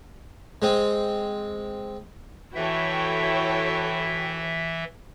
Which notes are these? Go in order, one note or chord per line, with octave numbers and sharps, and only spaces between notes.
G#3 C4
E3 E4 F#4 A4 C#5 E5 G5